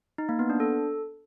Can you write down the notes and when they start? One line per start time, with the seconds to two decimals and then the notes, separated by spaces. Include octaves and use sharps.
0.18 D#4
0.29 A#3
0.39 B3
0.50 D4
0.60 A4